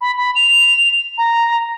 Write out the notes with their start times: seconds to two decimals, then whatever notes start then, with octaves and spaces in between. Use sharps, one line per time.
0.01 B5
0.18 B5
0.35 F7
1.18 A#5